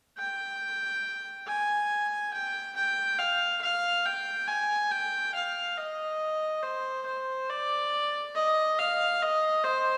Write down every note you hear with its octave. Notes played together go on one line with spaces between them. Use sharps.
G5
G#5
G5
G5
F5
F5
G5
G#5
G5
F5
D#5
C5
C5
D5
D#5
F5
D#5
C5